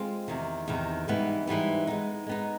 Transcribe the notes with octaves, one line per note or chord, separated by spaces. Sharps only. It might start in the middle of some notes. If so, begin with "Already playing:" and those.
Already playing: G#3 C4 F4
E2 C3 D#3
E2 C3 D#3
G#2 E3 G3 B3
G#2 E3 G3 B3
G#3 B3 D#4
G#3 B3 D#4